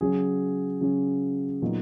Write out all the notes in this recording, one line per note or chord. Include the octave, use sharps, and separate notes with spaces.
C#3 F#3 C#4 G#4
C#3 F#3 C#4
A#2 F#3 B3 D#4